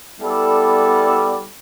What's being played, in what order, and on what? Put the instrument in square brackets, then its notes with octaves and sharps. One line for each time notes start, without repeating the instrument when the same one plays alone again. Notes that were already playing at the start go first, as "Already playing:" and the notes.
[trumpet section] G3 B3 E4 A4 D5